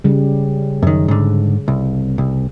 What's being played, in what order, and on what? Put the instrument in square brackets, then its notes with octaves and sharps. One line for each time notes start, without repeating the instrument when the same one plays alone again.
[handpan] C#3 G3
[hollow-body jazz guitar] F#2 D#3
G#2 D3
C2
C2